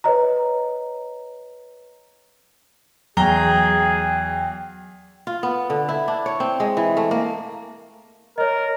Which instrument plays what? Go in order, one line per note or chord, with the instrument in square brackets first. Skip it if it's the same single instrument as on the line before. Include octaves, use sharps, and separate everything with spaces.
[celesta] B4 C#5 D#5 A#5
[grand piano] E2 A#5 G7 [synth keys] F#3 [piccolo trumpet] G#4 [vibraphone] G5
[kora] F4
B3
D3
E4
D4
C#5
C4
G#3
E3
A3
A#3
[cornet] A#4 [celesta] C#5 D#5